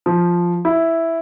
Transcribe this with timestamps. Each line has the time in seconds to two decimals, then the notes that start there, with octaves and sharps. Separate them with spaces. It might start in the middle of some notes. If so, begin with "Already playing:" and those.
0.06 F3
0.65 E4